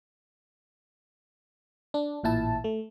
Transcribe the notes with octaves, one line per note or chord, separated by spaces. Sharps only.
D4
A1 A#2 E4 A5
A3